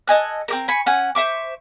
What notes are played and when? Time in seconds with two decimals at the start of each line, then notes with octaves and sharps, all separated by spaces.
0.08 A4 D#5 G#5 F#6
0.48 C4 G4 A#4
0.68 G#5 B5 C#6
0.86 C#4 F#5 G#5
1.15 C5 E5 C#6 D6